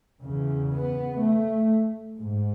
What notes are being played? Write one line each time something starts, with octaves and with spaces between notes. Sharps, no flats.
E2 C#3
B3
A3
G#2